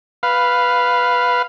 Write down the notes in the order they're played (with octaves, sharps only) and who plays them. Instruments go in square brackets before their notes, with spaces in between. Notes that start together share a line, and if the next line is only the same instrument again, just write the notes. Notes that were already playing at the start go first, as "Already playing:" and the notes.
[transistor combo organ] B4 F5